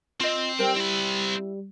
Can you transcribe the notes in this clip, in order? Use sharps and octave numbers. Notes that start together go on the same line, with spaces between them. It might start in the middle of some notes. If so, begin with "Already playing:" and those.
C4 F4 D#5
G3 A#4 C5 G5
C4 E4 B5